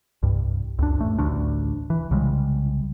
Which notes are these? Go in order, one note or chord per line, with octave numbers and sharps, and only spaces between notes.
C2 G2
C#2 F#2 D4
A1 A3
A1 D2 D4
E3
C2 C#3 G3 G#3